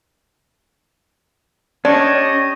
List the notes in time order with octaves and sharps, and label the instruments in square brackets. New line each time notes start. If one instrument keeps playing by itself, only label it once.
[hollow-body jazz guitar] C#4 [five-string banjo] D4 [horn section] G4 C#5 D#5